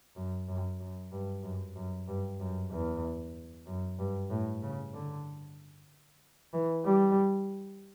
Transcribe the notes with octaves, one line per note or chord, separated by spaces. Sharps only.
F#2
F#2
F#2
G2
F#2
F#2
G2
F#2
E2
F#2
G2
A2
C#3
D3
E3
G3